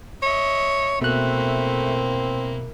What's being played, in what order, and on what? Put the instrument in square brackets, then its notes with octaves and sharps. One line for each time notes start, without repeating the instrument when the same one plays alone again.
[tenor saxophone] C#5 [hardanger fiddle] D#5 E5
[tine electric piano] B2 F#6 [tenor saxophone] A3 [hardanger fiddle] A#3 E4 [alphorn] C4